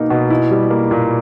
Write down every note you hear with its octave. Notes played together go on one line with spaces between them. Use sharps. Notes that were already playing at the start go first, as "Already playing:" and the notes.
Already playing: B2 A#3 D#4
B2
E4
G3
A#3
A#2